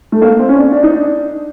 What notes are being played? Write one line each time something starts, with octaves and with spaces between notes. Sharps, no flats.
A3
A#3
C4
C#4
D4
D4
D#4
D4